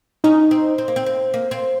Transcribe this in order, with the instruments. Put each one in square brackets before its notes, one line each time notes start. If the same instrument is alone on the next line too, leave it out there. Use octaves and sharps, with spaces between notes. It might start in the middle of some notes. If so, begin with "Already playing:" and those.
[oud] C#4 [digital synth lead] D#4
[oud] C4
C4
A#3
C4
C4
A#3
C4